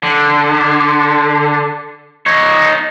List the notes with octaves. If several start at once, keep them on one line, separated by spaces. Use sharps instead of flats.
D3
D#4 C#5